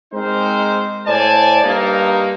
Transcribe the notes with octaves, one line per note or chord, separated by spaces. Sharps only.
G#3 C4 D#4 A#4 C5
A2 C5 D5 G#5 A5
G2 A#3 D#4